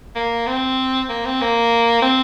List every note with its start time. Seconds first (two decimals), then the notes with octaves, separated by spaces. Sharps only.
0.16 A#3
0.47 C4
1.09 A#3
1.25 C4
1.41 A#3
2.02 C4